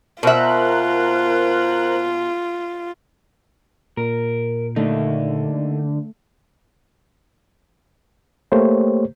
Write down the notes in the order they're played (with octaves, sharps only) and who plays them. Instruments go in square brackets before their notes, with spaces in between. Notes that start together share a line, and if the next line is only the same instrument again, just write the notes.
[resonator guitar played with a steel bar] B2 E5 [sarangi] F4 [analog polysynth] A#4 C5 F#6
[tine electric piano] A#2 [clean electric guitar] A#4
[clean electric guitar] D#2 D#4 [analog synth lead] D3 [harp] A3
[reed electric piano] A3 A#3 G4 C5 C#5